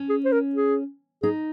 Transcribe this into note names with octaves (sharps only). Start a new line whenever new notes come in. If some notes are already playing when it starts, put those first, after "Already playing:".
Already playing: C#4
G#4
C5
A#4
G#4
D#4 G#4